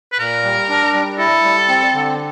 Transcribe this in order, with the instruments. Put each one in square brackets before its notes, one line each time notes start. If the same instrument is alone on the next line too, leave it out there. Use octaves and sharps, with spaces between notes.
[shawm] B4
[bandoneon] A#2 [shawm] A#4
[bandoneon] G3
D4
G3
[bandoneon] E4 [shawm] A4
[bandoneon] G3
C4
D3